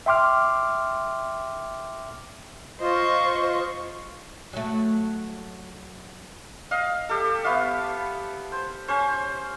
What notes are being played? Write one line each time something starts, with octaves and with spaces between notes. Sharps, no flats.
E5 G5 C6 D6 F6
F4 C5 D#5 C#6
F#3 A3
D#5 F5
G4 A4
B3 C#5 E5 F5
C5
C#4 C5